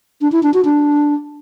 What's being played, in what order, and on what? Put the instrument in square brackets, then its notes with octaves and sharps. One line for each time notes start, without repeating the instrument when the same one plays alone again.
[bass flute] D4
E4
D4
F#4
D4